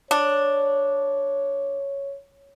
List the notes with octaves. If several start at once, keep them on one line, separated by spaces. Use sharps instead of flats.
D4 C#5